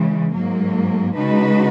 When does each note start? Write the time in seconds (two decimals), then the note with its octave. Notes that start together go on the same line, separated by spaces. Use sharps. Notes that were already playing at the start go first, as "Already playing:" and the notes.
Already playing: C#3 E3 G#3
0.33 G#2 F#3 A#3
1.15 C#3 G#3 D#4 F#4 B4